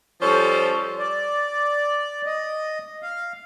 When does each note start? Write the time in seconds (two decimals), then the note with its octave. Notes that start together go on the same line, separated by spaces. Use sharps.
0.21 F3 G3 C#4 A4 C5
0.99 D5
2.26 D#5
3.03 F5